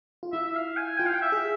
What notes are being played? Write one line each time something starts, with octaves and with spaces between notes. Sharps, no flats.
F4
E4 E5
E5
F5
G#5
F4 G5
F5
G5
E5
G#4